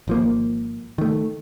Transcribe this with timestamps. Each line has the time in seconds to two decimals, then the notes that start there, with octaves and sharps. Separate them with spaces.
0.08 G#1 F3 A#3
0.98 D#3 A3